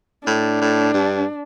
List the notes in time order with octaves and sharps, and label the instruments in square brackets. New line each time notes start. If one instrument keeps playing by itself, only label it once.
[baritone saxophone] A2 [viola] D4
[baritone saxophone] A2
G2